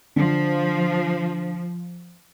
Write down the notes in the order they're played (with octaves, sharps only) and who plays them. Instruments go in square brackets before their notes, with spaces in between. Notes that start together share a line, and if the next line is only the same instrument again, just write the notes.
[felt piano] D3 [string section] F3